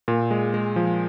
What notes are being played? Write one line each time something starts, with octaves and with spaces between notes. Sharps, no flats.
A#2
G#3
G#3
F3